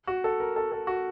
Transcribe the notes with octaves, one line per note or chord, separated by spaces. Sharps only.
F#4
A4
A#4
A4
A4
F#4